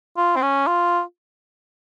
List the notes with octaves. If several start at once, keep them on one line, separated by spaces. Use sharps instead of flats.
F4
C4
C#4
F4